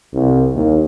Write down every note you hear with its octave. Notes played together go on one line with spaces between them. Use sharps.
C2
D#2